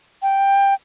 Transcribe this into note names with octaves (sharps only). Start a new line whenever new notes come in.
G5